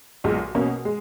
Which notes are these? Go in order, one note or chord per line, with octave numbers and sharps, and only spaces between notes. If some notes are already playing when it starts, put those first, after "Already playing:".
B1 A#2 G#3
B2 A#3 C#4
G#3